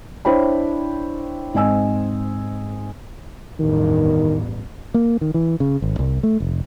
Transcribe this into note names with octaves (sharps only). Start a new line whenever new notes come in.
D4 E4 C5 C#5 G5 B5
G#2 C4 D#5 G#5 E6
A1 E2 G2 D#3
A#3
D#3
E3
C#3
G#1
C2
A3
F1